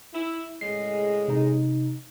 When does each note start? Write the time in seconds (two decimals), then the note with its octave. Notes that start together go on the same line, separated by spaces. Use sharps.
0.14 E4
0.61 A2 C#3 G#3 C7
1.28 C3 D#4